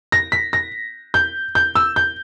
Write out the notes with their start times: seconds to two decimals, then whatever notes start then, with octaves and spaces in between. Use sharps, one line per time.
0.12 A#6
0.32 B6
0.53 A#6
1.14 G6
1.55 G6
1.75 E6
1.96 G6